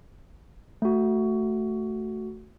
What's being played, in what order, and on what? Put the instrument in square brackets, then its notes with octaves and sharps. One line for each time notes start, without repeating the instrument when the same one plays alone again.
[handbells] A3 F#4